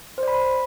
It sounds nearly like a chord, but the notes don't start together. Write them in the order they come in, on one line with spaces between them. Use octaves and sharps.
C5 D5 B5